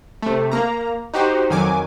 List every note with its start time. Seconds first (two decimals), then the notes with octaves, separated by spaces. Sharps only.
0.22 C3 A3
0.52 A#3 A#5
1.14 D#4 F#4 G4 C5
1.49 F2 D#3 F#3 G#5 D6